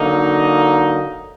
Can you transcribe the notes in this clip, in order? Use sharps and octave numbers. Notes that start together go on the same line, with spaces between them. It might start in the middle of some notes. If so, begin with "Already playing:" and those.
Already playing: D3 F#3 A#3 D#4